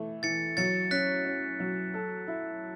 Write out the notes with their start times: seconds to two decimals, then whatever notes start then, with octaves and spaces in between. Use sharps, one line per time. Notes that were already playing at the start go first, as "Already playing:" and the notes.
Already playing: E3 A3
0.23 E3 A6 C#7
0.57 F#3 A6 C#7
0.91 C#4 F#6 B6
1.25 C#4
1.60 F#3
1.94 A4
2.28 E4